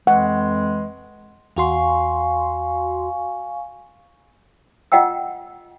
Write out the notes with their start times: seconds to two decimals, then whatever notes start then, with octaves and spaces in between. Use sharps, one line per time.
0.07 F2 E3 G#3 F#5
1.56 E2 F#4 F5 G#5 C6 C#6
4.92 F4 D#5 F#5 G5 E6